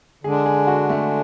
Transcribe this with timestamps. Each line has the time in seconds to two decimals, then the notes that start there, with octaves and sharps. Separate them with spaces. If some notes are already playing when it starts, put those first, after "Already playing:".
0.24 D3 G#3 D4 G#4
0.46 G#4
0.67 F#4
0.89 A3